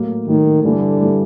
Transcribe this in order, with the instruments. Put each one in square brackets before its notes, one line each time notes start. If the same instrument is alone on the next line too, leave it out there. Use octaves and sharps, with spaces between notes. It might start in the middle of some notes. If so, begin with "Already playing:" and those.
Already playing: [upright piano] A2 F#3 A#3
[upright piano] A2 F#3 A#3 [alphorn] D#3
[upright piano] G2 E3 G3 [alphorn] D3
[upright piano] E3 G3